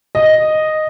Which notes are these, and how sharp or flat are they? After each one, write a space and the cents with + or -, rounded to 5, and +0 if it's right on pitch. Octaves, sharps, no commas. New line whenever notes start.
D#5 -5